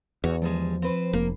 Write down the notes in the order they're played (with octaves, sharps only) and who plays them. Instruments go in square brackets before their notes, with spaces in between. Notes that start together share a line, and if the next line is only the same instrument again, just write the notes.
[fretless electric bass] E2 [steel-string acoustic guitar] F#4 C#5
[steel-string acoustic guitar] D2 G3 G#3 [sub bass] F3
[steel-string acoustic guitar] C4 B4 C5
[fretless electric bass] F1 [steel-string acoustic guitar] A#3